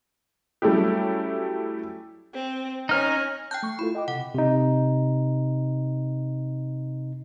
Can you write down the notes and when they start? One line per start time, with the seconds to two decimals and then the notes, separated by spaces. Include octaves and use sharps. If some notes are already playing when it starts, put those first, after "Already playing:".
0.62 F#3 G3 A3 C#4 E4 G4
2.33 C4
2.89 C#4 D#4 F6
3.51 G5 A5 F#6 G6
3.63 A3 C#6
3.79 E4 F4 A4 B5
3.95 D#5 G5 D6
4.08 C3 F#5
4.34 C3 D#4